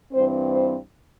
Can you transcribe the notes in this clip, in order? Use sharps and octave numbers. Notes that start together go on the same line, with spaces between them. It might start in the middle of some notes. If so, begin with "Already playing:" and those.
G2 E3 C4 C5
C5